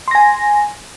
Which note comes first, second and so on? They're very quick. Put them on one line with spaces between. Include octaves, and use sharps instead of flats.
C6 A#6 G#5